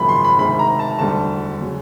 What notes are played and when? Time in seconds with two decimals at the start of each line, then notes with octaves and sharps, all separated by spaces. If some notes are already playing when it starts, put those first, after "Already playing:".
Already playing: G#1 F#2 C#3 F3 A#3 B5
0.09 C6
0.24 B5
0.38 D2 C3 D#3 G#3 B5
0.59 A#5
0.79 A5
0.99 E1 D2 D3 G3 A5
1.60 C#3 F#3